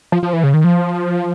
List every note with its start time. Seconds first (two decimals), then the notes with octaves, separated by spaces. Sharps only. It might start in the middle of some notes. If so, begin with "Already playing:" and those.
0.12 F3
0.23 F3
0.33 E3
0.44 C#3
0.54 D#3
0.64 F3